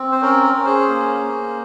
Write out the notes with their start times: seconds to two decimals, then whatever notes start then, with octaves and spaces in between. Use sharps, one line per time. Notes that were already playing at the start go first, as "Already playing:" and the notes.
Already playing: C4
0.12 C5
0.21 C#4 A#4
0.43 A#4
0.54 C#4
0.65 G#4 C5
0.88 A#3
1.20 A#3